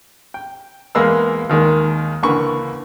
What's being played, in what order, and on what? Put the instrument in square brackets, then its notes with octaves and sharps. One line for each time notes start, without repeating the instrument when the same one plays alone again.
[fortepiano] G5
E2 G#3 A#3 B4 F5 E6
D#2 D#3 G#3 A#3
C#2 D3 E3 A#3 B5 C#6